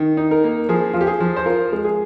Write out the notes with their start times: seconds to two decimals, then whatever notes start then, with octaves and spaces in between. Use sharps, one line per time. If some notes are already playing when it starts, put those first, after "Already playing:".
Already playing: D#3
0.17 D#4
0.31 A#4
0.44 A#3
0.69 F3 G#4
0.93 F3 F4
1.01 G4
1.07 G#4
1.20 F3
1.36 C5
1.46 F4 A#4
1.72 G#3
1.85 G#4